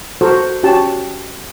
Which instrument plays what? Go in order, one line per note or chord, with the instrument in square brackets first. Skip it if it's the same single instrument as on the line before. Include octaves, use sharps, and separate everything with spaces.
[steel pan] F#4 A4 A#4 C5
C#4 F#4 G4 A5